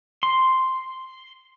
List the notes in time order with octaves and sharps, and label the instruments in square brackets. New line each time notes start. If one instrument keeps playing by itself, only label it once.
[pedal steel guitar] C6